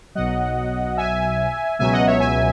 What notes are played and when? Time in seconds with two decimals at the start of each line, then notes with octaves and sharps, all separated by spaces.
0.15 B1 B2 F#3 D#5 F#5
0.97 E5 G#5
1.79 C#2 B2 F#3 E5 G#5
1.93 D#5 F#5
2.06 C#5 E5
2.20 E5 G#5